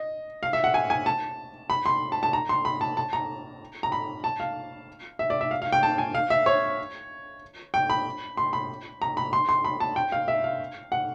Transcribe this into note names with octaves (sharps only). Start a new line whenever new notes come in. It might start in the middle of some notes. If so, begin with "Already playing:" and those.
Already playing: D#5
F5
E5
F#5
G#5
G#5
A5
B5
C6
A5
A5
A#5
C6
B5
A5
A5
A#5
A#5
B5
A5
F5
E5
D5
E5
F5
F5
G5
A5
G#5
F5
E5
C#5
G5
B5
C6
B5
A#5
B5
C6
C6
B5
A5
G5
F5
E5
F5
F#5